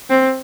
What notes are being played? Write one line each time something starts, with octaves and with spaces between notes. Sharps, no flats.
C4